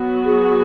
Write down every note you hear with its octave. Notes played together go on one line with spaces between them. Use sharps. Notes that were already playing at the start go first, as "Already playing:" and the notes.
Already playing: F#3 B3 F#4
G#4